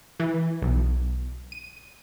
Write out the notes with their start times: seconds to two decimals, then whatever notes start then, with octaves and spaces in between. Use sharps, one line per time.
0.20 E3
0.62 B1
1.52 D#7